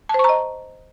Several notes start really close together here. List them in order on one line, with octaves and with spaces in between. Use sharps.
A5 C5 C#6 A#5 D#5